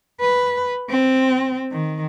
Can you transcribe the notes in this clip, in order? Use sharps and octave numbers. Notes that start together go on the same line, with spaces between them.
B4
C4
D#3